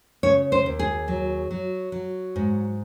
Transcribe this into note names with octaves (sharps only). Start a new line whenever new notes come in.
C#3 C#5
C5
D#2
G#4
F#3
F#3
F#3
G#2